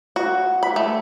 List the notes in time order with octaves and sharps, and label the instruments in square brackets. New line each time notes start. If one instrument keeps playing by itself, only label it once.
[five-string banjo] F#4
B5
A3